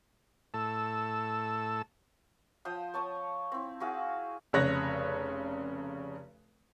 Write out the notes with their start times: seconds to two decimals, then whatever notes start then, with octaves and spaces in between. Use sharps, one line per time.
0.54 A2 A4 A5 E6
2.65 F3 C5 G5 D#6
2.94 C#5 A5 C#6 D#6
3.52 C4 E4
3.80 E4 F#4 G#4 F5
4.53 F1 C#3 C#5 F#6 A#6